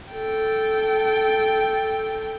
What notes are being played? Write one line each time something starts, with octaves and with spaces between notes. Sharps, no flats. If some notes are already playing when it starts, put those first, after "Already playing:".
A4 G5